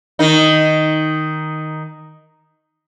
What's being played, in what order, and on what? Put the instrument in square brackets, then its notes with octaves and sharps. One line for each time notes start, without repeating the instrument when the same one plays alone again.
[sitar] D#3 D#4